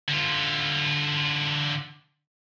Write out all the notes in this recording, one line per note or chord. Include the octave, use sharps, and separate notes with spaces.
D3 F4